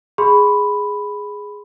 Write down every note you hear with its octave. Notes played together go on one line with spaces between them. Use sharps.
G#4 B5 C6